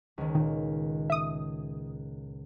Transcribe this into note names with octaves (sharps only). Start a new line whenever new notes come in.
C#2 D#3
A#2 D#3
E5 D#6